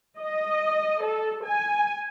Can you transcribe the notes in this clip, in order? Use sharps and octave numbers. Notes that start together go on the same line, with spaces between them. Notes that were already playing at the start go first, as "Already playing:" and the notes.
D#5
A4
G#5